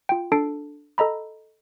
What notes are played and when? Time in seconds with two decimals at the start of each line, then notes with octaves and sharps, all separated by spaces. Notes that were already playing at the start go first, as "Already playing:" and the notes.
0.09 F4 G5
0.32 D4 A4 A5 C7 D7
0.98 A4 D#5 A#5 B5